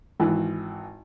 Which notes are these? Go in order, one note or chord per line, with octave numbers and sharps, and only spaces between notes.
G#1 E3